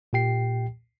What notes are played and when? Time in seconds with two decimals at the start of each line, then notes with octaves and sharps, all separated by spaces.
0.13 A#2 G4 G5 C7